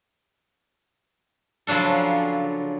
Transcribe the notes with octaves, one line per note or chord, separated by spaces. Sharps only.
C#3 F3 F#3 D4 A4